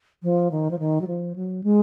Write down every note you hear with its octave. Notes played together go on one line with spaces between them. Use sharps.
F3
D#3
F3
D#3
F#3
F3
F#3
G#3